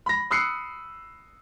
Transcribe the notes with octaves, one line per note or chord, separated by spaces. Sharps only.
B5 A#6
B5 D#6 E6 F#6 C7 C#7